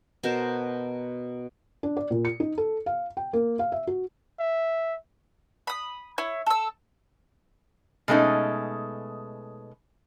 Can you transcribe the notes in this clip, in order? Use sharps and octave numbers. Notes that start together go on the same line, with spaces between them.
B2 A#4 C5 A5
D4
D5
A#2
C#7
D#4
A4
F5
G5
A#3
F5
E5
F#4
E5
B5 D#6
E4 C#5
A4 E6
B2 G#3 A3 C#4 D#4